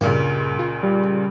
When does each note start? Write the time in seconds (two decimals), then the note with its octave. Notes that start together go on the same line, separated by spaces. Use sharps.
0.01 C#2 G2 A#2 C#3 A#3
0.59 F4
0.83 G3